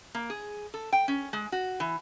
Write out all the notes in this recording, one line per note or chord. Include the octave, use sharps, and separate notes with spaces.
A#3
G#4
A4
G5
C#4
G#3
F#4
E3